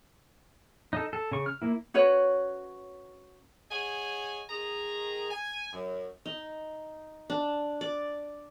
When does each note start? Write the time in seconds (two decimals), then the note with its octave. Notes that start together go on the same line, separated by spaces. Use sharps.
0.93 D#4 A4
1.13 A4
1.32 C#3 C#6
1.46 F6
1.62 A#3 E4
1.94 C#4 F#4 B4 C#5
3.71 G#4 C#5 D#5 F#5 G#5
4.50 D#3 G#4 A#5
5.30 G#5
5.73 F#2
6.26 D#4
7.30 D4
7.81 D5